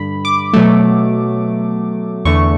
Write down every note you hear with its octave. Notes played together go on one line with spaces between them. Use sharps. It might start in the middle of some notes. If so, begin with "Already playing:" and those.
Already playing: G2 D3 B5
D6
B2 F#3 A3
E2 D3 A3 C#6